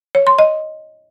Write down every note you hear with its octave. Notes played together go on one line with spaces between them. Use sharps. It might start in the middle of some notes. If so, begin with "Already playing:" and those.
C#5
C6
D#5